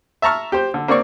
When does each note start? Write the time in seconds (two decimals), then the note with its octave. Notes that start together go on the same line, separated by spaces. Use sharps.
0.22 E5 A5 A#5 C#6 F6
0.52 G4 C5
0.74 D3
0.88 A#3 C4 D4 D5 C#6